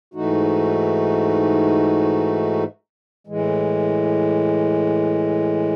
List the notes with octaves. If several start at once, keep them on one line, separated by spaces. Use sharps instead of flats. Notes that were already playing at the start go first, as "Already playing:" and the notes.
G#2 E3 A3 D#4 F#4
A2 E3 G#3